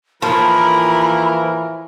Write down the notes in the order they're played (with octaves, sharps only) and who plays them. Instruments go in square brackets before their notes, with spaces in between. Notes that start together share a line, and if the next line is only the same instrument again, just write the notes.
[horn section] A2 A#3 A#4 [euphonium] E3 [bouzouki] F3 [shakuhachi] B5